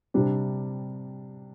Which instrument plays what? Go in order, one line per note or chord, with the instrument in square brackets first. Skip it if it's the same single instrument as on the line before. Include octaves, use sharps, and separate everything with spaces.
[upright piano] C3 G3 D4